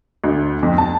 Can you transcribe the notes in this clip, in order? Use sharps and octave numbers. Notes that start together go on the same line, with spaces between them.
D2
F2
A5